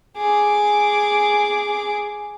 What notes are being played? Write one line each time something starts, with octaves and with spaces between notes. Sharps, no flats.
G#4 D6